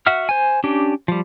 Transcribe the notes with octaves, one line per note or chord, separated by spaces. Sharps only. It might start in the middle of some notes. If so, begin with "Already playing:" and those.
F#4 E5 F#5 F6
C5 G#5
C#4 D4 G4
F3 G3